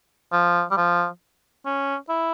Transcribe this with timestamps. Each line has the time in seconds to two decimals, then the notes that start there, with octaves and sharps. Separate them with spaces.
0.32 F3
0.71 G3
0.77 F3
1.65 C#4
2.09 E4